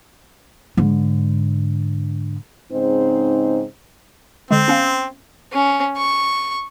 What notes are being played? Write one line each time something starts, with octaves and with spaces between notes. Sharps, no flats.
G#2 D3
G#2 C#3 C4 D#4 C5
D3 G#3 C4
B3 C#4 F5
C#4
C#6